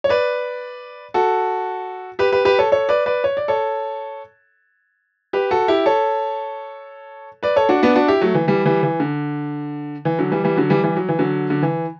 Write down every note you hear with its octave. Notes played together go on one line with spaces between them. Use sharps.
C#5
B4 D5
F#4 A4
G4 B4
G4 B4
G4 B4
A4 C#5
A4 C#5
B4 D5
B4 D5
C#5
D5
A4 C#5
G4 B4
F#4 A4
E4 G4
A4 C#5
B4 D5
A4 C#5
D4 F#4
B3 D4
D4 F#4
E4 G4
F#3 A3
E3
E3 G3
E3 G3
E3
D3
E3
D3 F#3
E3 G3
E3 G3
D3 F#3
E3 G3
E3 G3
F#3
E3
D3 F#3
D3
E3